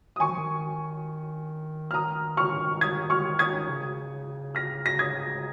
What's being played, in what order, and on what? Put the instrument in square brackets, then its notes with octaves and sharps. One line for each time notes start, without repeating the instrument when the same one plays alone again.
[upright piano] D#6
[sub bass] D#3 [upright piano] G#5 C#6
[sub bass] F3
D#3
[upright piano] F6
[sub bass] D#3 [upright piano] A#5 D#6
[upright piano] C#6 F6
D#6 G#6
C#6 F6
D#6 G#6
[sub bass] C#3
[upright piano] F6 A#6
A#6
D#6 G#6